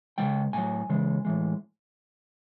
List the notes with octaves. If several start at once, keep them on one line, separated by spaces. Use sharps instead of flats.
C#3 F3 G#3 G5
A2 F#3 G#5
C#3 E3 G#3
A2 E3 G#3